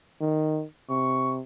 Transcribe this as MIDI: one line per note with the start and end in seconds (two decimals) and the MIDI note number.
0.21 0.64 51
0.89 1.41 48
0.89 1.34 85